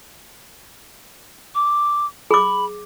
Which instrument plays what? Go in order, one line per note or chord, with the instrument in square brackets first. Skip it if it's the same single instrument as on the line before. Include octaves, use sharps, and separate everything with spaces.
[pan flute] D6
[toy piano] G#4 D6 [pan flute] B5